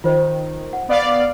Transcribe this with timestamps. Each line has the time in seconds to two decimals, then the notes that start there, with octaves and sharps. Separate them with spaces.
0.04 D#3 F4 C5
0.73 F#5
0.88 B3 D5 F5